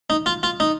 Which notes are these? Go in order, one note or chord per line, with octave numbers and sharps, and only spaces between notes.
D#4
F4
F4
D#4